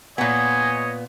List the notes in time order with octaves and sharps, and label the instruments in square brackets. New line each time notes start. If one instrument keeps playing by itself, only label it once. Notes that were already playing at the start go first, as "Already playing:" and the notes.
[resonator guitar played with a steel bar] A#2 B3 [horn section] C#5 D#5 [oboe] G#5